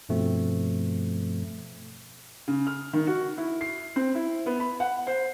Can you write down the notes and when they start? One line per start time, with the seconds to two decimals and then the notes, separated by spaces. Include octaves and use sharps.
0.09 G2 B2 F3 A3 C4
2.48 C#3
2.67 F6
2.93 D#3
3.07 F#4
3.38 E4
3.61 C7
3.96 C4
4.15 E4
4.46 B3
4.60 B5
4.80 F#5
5.07 C5